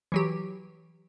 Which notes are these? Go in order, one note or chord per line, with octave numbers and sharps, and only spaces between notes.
E3 F#3 G4